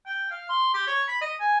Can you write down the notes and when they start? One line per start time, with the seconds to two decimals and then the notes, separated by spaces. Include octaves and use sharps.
0.06 G5
0.31 F5
0.49 C6
0.74 G4
0.87 C#5
1.08 B5
1.21 D#5
1.40 G#5